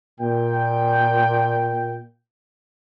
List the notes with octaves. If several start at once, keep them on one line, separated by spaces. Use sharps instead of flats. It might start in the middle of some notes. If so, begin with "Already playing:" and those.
A#2 G5